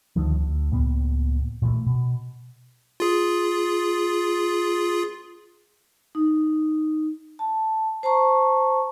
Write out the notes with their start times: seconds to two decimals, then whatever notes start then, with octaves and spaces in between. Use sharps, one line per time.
0.16 D2 D3 D#3 F3
0.39 D2
0.72 C#2 A2 A#3 B3
1.62 A#2 E3 F3 A3
1.86 B2
3.00 F4 G#4
6.15 D#4
7.39 A5
8.03 C5 A5 A#5 C#6